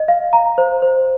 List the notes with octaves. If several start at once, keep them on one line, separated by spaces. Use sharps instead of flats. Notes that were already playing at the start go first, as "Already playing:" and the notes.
Already playing: D#5
F5
A#5
C5
C5